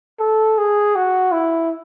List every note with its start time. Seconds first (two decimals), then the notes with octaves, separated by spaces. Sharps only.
0.20 A4
0.58 G#4
0.96 F#4
1.32 E4